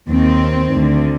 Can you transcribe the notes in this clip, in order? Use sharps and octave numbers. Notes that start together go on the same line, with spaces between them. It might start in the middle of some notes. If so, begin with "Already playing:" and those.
D#2 D#3 C4
D2 D3